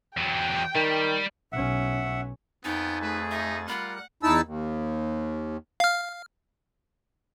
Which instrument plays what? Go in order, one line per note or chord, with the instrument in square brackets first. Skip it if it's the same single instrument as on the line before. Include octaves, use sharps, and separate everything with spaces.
[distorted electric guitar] E2 F#3 [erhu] G5
[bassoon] D#3 [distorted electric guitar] G3
[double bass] B1 C#4 [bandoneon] E5 F#5
[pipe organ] F2 G#5 A6 [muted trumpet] B3 [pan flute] D#4 [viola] G5
[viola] A3 G#4 [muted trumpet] B4
[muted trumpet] D#4 [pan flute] E5
[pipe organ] G3 A#4 F#6 [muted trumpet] F4 [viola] F#5 [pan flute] B5
[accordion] E2 D#4 E4 A5 E6
D#2
[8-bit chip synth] F5 F6